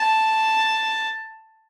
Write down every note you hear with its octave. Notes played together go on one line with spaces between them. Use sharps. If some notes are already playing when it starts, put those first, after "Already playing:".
Already playing: A5